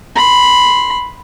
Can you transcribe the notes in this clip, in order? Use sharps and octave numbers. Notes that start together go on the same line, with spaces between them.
B5 C6